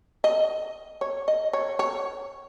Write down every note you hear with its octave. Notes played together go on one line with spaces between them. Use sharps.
D#5
C#5
D#5
C#5
C#5